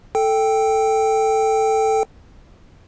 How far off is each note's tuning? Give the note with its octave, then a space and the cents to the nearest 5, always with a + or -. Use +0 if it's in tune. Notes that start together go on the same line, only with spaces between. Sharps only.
A4 +0 G5 +0